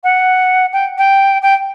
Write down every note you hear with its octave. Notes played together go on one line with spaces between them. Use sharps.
F#5
G5
G5
G5